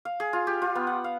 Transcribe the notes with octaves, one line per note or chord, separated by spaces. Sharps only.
F5
G#4
F4
G4
F4
B3
F#5
F5